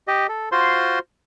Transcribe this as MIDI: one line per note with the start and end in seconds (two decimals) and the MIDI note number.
0.08 0.27 67
0.08 0.27 75
0.29 0.49 69
0.52 0.99 65
0.52 0.99 66
0.52 0.99 72
0.52 0.99 84